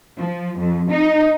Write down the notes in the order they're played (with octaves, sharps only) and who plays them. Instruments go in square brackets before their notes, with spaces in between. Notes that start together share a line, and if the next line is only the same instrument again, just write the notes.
[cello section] F3
F2
D#4